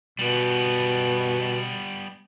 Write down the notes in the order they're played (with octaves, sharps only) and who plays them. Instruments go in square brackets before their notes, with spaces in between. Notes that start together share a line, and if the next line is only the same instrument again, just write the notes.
[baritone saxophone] B2 [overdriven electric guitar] G3 B3